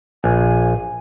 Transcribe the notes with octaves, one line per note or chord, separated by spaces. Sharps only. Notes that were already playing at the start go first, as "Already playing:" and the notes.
A#1 G#5